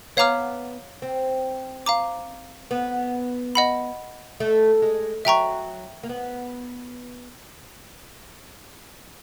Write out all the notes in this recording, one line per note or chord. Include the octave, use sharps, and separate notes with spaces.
B3 C#5 F5 A#5 D6 F6
C4
F5 A#5 D6
B3
D#5 F#5 B5
A3
G#3
F#3 E5 G5 A#5 C#6
A#3
B3